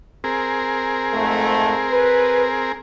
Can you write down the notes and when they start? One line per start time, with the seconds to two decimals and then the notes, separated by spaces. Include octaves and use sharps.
0.24 C4 G#4 A#4
1.13 F2 G#2 A3
1.90 B4